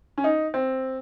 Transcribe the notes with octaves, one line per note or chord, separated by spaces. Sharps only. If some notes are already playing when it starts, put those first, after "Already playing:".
C#4
D#4
C4